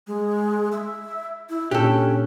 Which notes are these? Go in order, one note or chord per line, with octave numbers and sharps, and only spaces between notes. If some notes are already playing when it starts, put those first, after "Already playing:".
G#3
E5
E4
A#2 C#4 D4 G4 A4 F#6